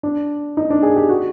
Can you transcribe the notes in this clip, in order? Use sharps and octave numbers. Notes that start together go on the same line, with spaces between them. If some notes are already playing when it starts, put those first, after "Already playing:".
D4
D#4
D4
G#4
G4
F#4